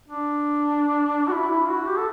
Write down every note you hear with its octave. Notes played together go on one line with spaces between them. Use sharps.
D4
F#4
E4
E4
F#4
G4
A4